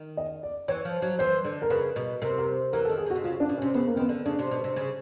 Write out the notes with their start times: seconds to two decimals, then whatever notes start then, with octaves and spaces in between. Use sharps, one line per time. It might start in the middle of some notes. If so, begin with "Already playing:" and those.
Already playing: D#3
0.17 D#5
0.43 D5
0.68 E3 C#5
0.85 F3
1.02 F#3
1.19 E3 C5
1.45 D3
1.62 A#4
1.70 C#3 B4
1.96 B2
2.22 C3 A#4
2.38 A#4
2.73 E3 A#4
2.85 A4
2.89 D#3
2.98 G#4
3.06 D3 F#4
3.16 C3
3.24 C#3 F4
3.40 D4
3.49 B2
3.57 C#4
3.62 C3
3.74 C#3 B3
3.87 A#3
3.95 D#3 B3 C4
4.09 D3
4.26 C#3 D4
4.39 C3
4.51 B2
4.64 C3
4.76 C#3